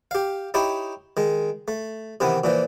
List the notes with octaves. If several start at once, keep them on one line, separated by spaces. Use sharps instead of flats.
G4 F5
D#4 E4 G4 C#5
D#3 G#3
A3
C3 D#3 E3 B3
A#2 E3 F3